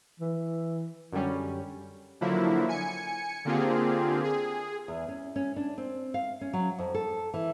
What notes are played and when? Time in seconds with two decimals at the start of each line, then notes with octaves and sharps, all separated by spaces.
0.20 E3
1.12 F#2 D3 G3 C#4
2.21 D3 F3 F#3 A#3 E4
2.69 G#5 C#7
3.45 D3 A#3 C4 F4 G4 G#4
4.24 G#4
4.88 E2
5.08 C#4
5.36 C#4
5.56 D4
5.78 C4
6.14 F5
6.41 C#4
6.53 F#3
6.78 F2
6.94 A4
7.34 E3